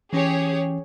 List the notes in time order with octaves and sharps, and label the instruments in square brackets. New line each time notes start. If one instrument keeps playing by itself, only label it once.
[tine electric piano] E3 C#4 [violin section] G4 G#4 C#5